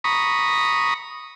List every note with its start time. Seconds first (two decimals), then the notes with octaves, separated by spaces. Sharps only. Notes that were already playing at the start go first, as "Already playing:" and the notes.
0.04 A#5 B5 C#6 D#6